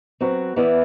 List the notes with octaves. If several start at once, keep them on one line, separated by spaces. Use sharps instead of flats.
F#3 C4 F#4 B4
E3 B3 E4 B4 D5